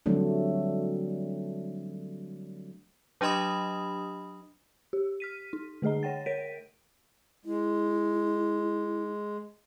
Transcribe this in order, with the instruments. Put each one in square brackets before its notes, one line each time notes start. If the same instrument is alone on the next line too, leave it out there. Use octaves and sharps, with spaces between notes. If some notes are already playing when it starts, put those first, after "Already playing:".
[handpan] D3 F#3 G3 A3 C4 D4
[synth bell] F#3 D4 G4 D#5 B5 D#6
G4
F6 B6 D#7
D#4
D3 A3 G#4 D#5 A#5
C#5 F#5 G5 A6
A#4 C#5 B6 D7 D#7
[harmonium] G#3 [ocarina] E4